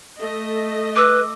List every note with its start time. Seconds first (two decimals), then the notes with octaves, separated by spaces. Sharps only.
0.18 A3 D#5
0.96 B4 D6 E6